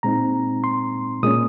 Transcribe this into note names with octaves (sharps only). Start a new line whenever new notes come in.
A#2 G#3 C4 D#4 A#5
C6
A#2 G#3 C#4 D#6